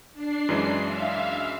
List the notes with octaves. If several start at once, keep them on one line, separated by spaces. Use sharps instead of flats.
D4 C7
F#2 E3 G#3
E5 F5